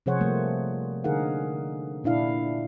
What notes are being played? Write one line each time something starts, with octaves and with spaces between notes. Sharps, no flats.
C3 F3 G#4 C5 C#5 F#5
F3 G3 A3 A#3 C4
D3 D#4 G#4 A#4 F5 F#5
A#2 D4 E4 F5